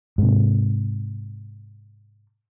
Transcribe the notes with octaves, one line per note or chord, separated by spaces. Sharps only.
G#2 C3